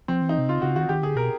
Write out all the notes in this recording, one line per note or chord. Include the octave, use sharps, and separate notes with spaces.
F3 C4
E3
D#4
C3
C#3 F4
C#3 F#4
D#3 F#4
D#3 G4
D3 G#4
B2 A#4